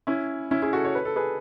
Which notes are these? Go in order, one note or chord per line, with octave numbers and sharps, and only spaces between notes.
C#4 E4
C#4 E4
E4 G#4
F#4 A4
C#5
B4
A4
G#4 B4